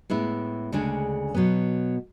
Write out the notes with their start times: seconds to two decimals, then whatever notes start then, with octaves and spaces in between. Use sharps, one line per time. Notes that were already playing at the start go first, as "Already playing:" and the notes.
0.10 A2 G#3 B3 E4
0.72 D2 C#3 G#3 D4 G#4
1.34 B2 F#3 B3